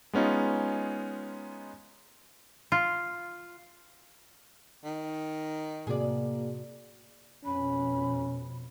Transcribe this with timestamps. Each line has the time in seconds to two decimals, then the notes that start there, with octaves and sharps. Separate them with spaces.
0.13 G#3 B3 C#4 D#4 F4
2.72 F4
4.85 D#3
5.87 A2 C3 A#3 F#4 G#4 D5
7.44 F2 B2 C#4 B5